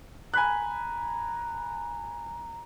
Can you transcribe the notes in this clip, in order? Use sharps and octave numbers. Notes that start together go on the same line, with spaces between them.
G#5 A#5 B5 F#6